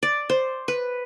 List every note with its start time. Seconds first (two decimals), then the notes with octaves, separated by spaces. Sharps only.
0.03 D5
0.30 C5
0.68 B4